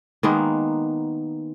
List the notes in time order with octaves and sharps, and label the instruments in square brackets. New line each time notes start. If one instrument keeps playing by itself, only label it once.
[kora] D#3 G#3 A#3 B3